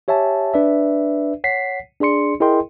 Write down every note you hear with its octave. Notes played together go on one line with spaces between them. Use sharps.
G4 C#5 E5 G#5 A5
D4 B4 D5 E5
C#5 F#5 B6 C7
D4 G#4 D5 C6 C#7
E4 G#4 A#4 D#5 G5 C6